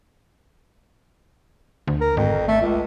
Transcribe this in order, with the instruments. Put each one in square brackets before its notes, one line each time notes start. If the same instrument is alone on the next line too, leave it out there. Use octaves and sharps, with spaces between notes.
[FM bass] D2
[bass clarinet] A#4
[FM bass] G#1 [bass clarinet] F2
[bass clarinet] A3
C#2